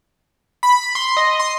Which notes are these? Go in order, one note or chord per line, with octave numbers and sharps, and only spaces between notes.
B5
C6
D#5
C6